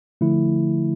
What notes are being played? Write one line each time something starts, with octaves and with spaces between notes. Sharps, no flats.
D3 F3 A3 E4